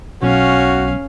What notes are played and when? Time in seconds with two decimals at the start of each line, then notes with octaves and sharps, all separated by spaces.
0.22 B1 C#4 F#4 F5